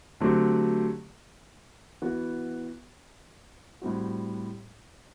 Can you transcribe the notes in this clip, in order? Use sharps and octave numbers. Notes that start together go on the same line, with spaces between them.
D3 F#3 A3 C4 G4
E3 B3 F#4
A2 G3 C4 F#4